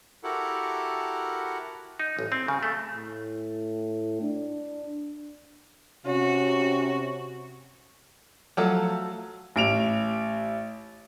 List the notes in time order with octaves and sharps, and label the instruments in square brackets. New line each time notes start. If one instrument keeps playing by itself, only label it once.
[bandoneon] E4 F#4 G4 A4 A#4 F#5
[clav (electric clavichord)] D#4
A1
C4
C#3
A3
[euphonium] A2
D4
[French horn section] C3 [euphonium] C#4 [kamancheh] F#4
[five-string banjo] F3 F#3 A3
[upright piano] A1 D7 F7